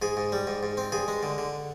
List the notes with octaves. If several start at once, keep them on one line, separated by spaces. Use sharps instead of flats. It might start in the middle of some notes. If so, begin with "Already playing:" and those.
G#2 G#4
G#2
G3
G#2
G#2
C4
G2 G#4
G#3
D3
D3